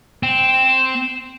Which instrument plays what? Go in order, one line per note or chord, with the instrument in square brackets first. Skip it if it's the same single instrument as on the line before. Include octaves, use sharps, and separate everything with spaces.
[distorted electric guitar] C4 [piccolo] E7